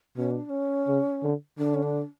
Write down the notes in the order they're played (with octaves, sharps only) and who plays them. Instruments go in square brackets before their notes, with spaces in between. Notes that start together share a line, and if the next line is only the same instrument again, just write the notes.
[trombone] B2 [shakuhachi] C#4
[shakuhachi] D4
D4
C#4
[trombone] C#3
D3
[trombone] D3 [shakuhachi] D4
[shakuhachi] C#4
D4